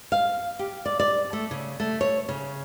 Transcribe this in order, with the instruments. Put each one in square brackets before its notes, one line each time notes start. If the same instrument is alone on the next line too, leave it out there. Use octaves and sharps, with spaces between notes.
[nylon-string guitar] F5
G4
D5
D5
A3
C#3
A3
C#5
C#3